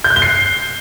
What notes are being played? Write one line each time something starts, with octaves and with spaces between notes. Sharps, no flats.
G6
F#6
G7
C7